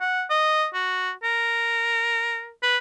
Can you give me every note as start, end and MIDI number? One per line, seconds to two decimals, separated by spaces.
0.01 0.24 78
0.30 0.66 75
0.74 1.12 66
1.23 2.50 70
2.63 2.78 71